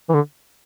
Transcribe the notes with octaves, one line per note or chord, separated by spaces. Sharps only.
E3
D3